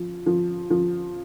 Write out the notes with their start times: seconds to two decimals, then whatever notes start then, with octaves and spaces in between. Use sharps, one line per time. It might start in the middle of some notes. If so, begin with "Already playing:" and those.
Already playing: F3
0.26 F3
0.71 F3